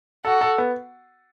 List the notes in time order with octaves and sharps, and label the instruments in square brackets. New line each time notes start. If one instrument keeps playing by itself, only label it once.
[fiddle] F#4 [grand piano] A4
[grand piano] A4
B3